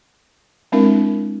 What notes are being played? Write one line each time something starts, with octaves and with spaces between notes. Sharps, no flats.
G#3 C4 D4 E4 A#4 E5